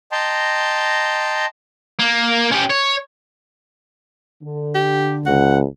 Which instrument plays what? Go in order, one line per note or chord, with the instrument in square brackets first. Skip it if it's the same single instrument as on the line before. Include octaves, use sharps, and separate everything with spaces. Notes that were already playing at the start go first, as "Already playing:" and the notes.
[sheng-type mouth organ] D#5 G5 A5 A#5 C6
[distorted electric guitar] A#3
C#4 G4
C#5
[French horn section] D3
[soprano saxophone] G4
[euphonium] C#2 [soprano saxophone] F#5